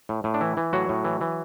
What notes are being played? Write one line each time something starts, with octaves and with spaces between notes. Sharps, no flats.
A2
A2
D4
E3 E4
E3
A2 F#3 F#4
A2
E3
E3